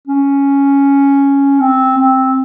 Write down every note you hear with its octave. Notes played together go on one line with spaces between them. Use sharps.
C#4
C4
C4